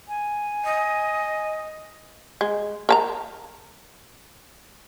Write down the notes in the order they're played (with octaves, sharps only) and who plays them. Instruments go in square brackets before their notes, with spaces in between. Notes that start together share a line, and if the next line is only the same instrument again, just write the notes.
[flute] G#5
[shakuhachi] D#5
[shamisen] G#3
A#4 A5 A#5